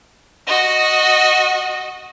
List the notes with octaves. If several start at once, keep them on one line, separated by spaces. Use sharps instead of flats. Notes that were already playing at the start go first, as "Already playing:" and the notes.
F#4 D#5